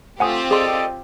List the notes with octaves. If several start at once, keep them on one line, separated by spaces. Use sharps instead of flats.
A3 C4 F4 G4 F#5 G#5 D#6
G#4 A4 D5 D#5 C6